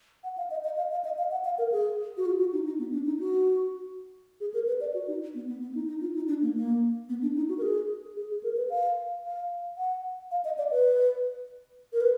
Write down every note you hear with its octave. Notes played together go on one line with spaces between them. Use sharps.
F#5
F5
D#5
D#5
F5
F5
D#5
F5
F#5
F5
A#4
G#4
F#4
F4
F#4
D#4
D#4
B3
D4
D#4
F#4
G#4
A#4
B4
D5
F#4
D#4
B3
B3
B3
D#4
D#4
F4
D#4
D4
A#3
A#3
B3
D4
D#4
F#4
A#4
G#4
G#4
G#4
A#4
B4
F5
F5
F#5
F5
D#5
D5
B4
A#4
B4